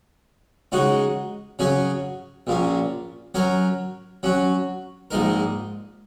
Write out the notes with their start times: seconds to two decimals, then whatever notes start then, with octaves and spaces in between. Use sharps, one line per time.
0.72 C#3 G#3 D#4 F#4 C#5
1.59 C#3 F#3 C#4 G#4 C#5
2.47 A#1 A#2 A#3 C#4
3.35 F#3 C#4 A#4 C#5
4.23 F#3 C#4 F#4
5.11 A#1 G#2 G#3 D#4 A#4